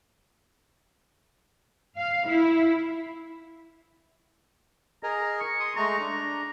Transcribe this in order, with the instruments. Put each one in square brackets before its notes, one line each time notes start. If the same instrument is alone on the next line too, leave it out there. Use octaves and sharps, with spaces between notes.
[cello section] F5
E4
[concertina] G#4 A#4 D#5 [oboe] A#5
[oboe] C#6
[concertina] C6 D#6
[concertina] G#3 A3 C#6 [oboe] A#5
[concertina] D4